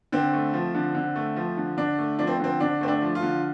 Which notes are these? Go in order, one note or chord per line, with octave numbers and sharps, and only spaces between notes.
D3 C4
A3
F3
D3
D3
A3
F3
D3
D3 D4
A3
F3 D4
C4
D3 C4
D3 D4
A3 C4
D4
F3
F4
D3